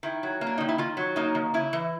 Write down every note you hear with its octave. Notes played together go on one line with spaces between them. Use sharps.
D#3 E4
F#3
A#3
D4
D#3 D#4
E4
D#3 F4
F#3
A#3 D#4
D#3
C#3 E4
E3